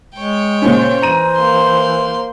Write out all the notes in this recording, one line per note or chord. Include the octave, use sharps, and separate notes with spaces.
G#3 C#5 G5
A#2 C#3 C#4 C5
E3 A#5 D#7
A#3 C6